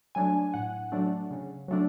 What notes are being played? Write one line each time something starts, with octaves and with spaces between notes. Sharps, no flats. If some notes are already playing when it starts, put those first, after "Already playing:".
F#3 A3 D4 G#5
A2 F#5
F#3 A3 D4
C#3
F#3 A3 D4